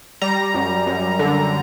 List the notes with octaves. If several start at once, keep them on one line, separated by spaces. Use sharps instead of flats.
G3 A#5
F#2
F#2
D3